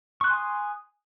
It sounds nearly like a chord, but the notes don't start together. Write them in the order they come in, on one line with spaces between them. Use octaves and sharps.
C#6 F#6 C6 G#5 D#6